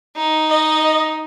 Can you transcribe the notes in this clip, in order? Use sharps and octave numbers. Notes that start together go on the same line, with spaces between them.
D#4
D#5